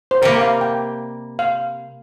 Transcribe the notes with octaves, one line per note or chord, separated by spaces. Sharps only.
C5
C3 G3 A#3 A#4
F5
G5
F5